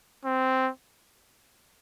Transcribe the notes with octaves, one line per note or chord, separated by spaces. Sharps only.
C4